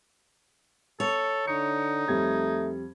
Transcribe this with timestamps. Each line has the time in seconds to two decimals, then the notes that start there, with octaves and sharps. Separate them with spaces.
1.00 A4 C#5
1.47 D3 D#4 C#7
2.08 F2 G3 A3 G#6